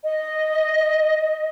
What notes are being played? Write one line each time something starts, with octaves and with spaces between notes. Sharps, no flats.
D#5